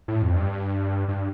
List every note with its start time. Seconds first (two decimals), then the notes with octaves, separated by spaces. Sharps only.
0.08 A2
0.22 F2
0.36 G2
1.09 G2